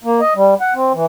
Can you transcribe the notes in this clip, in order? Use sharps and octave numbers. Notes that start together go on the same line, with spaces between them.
A#3
D#5
G3
F#5
C4
E3